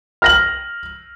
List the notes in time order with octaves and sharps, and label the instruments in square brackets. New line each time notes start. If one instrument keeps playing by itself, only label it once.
[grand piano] F6 A#6 F#7